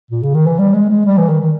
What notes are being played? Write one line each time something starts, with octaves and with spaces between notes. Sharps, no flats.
A#2
C#3
D#3
E3
G3
G#3
G#3
G3
E3
D#3
D#3